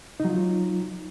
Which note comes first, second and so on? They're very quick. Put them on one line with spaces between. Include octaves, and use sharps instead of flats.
D#4 F#3 F4